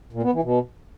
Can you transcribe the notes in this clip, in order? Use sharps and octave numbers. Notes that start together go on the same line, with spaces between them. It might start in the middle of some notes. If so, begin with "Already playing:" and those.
A#2
B3
E3
B2